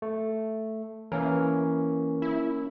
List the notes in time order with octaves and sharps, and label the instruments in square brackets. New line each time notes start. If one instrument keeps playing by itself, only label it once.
[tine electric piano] A3
[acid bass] E3 [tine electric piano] A#3 C#4 A#4
[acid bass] E4